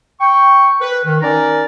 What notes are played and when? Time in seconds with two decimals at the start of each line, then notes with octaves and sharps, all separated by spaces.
0.21 G5 C#6
0.81 B4
1.05 D#3
1.22 C#4 D#4 A#4 D5 A#5